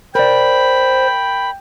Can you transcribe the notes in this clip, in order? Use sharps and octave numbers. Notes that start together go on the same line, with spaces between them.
A#4 C5 D5 G5 B5